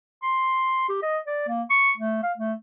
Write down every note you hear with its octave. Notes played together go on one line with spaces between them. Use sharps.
C6
G4
D#5
D5
A#3
C#6
A3
F5
A3